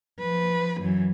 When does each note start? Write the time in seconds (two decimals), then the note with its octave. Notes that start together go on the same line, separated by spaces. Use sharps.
0.19 F3 B4
0.81 F#2 E3